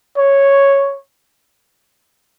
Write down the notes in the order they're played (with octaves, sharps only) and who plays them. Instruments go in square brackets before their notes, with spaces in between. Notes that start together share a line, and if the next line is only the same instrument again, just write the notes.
[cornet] C#5